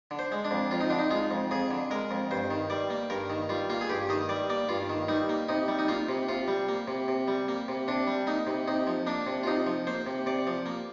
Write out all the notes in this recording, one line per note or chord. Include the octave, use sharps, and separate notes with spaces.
D3
C5
G#3
D4
F2
F2 F4
D#4
D3 D4
D#4
G#3 F4
F2
F2 G#4
D3
G#3 A#4
F2
G2 C5
D#3
G3 D5
A#3
G2 A#4
D#3
G3 F4
A#3 F4
G#4
G2 G4
D#3 D#5
G3 D5
A#3 D5
G2 F4
D#3
G3 D#4
A#3
C3 D#4
G3
D#4
A#3 F4
C3
C3 F4
G3
A#3
C3
C3
G3
A#3
C3
C3 D4
G3
A#3 D#4
C3
C3 D#4
F3
A#3 D4
C3
F4
C3 D#4
F3
A#3 C5
C3
C3 D5
F3
A#3